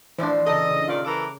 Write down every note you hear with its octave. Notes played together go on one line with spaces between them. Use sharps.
A2 E3 F3 D4 C5 D5
A#2 C#3 A4 D#5
C#3
D#3 F4 D5
E3 A4 A#4 D6